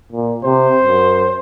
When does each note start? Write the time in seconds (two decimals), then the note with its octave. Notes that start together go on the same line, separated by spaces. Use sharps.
0.12 A#2
0.44 C3 C5
0.83 F#2